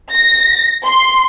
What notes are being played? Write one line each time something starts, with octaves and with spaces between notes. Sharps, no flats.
A#6
C6